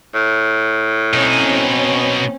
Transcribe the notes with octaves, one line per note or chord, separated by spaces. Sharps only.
A2
B2 C4 C#4 D#4